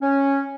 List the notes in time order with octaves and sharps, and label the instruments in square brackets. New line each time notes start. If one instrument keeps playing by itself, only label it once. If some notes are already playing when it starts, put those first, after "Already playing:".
[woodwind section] C#4